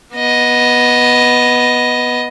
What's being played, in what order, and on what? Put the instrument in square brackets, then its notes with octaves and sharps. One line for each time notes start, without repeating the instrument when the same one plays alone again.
[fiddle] B3 D#5